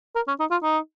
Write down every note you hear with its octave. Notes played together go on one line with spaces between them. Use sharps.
A#4
C#4
D#4
F4
D#4